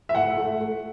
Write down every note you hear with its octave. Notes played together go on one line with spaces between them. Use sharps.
E5
A2 F#5
A3
A3